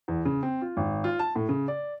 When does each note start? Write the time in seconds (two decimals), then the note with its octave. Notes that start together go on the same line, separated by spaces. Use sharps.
0.08 E2
0.25 C#3
0.43 C4
0.62 F4
0.77 G#1
1.04 F4
1.19 A5
1.36 A2
1.49 C#3
1.68 D5